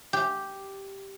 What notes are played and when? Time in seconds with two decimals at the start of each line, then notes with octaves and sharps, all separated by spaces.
0.13 G4